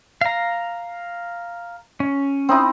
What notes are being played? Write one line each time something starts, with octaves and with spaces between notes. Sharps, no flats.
F5 A#5
C#4
C4 D#4 E4